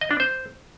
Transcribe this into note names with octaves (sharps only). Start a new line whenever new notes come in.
D#5
D4
C5